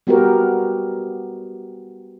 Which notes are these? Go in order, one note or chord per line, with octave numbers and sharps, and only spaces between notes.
G3 B3 F#4 G4 A#4